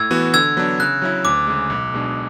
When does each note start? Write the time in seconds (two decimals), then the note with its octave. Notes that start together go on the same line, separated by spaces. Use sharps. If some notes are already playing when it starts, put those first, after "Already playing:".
Already playing: A2 E6 G#6
0.11 E3 B3 F#4
0.33 D3 E6 G#6
0.57 F#3 B3 D4
0.80 C#3 F#6
1.02 F#3 C#4 E4
1.25 D2 D6
1.47 C#3 G#3
1.70 B1
1.94 B2 G#3 D4